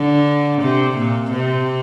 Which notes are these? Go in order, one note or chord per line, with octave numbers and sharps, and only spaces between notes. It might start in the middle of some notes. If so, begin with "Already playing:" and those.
Already playing: D3
C3
A#2
C3